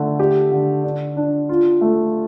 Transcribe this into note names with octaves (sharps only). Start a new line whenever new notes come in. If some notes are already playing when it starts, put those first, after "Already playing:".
Already playing: D3 A3
G4
D3
D4
D4
F4
A3